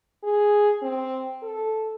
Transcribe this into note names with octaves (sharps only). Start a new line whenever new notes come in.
G#4
C4
A4